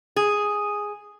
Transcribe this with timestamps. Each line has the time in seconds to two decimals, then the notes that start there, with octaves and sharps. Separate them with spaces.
0.16 G#4